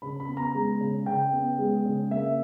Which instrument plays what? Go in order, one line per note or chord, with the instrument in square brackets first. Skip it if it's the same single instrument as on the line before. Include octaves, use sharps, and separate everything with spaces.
[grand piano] C#3 B5
B5
B3
A#5
G#3
C#3
C#3 G5
B3
G#3
C#3
A#3 E5